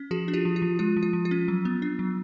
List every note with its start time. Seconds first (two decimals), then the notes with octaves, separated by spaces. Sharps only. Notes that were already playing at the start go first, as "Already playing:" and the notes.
Already playing: C#4
0.11 F3 F#4 G#4
0.28 D4
0.34 F4 G4
0.45 F3
0.56 F4
0.62 F3
0.79 G#3 F4
0.97 F3
1.03 F4
1.13 F3
1.25 F4
1.31 C#4
1.48 F#3
1.65 B3
1.82 D4
1.99 F#3